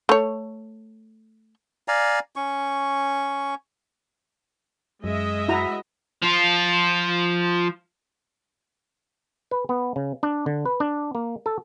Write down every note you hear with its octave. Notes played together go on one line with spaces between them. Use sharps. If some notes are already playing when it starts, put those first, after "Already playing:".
A3 C#5
D5 F5 G#5 A#5
C#4 C#6
F#2 G#3 D#5 E5
E4 F#4 A#5
F3 F4
B4
B3
C#3
D4
D3
B4
D4
A#3
A4